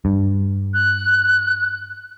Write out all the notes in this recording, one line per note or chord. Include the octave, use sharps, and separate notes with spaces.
G2
F#6